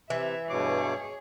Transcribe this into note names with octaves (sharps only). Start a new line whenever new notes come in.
C3 E3 E5
G2 B2 G#4 C#5 D6